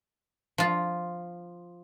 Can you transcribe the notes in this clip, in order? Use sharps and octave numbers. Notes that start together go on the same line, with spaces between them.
F3 F4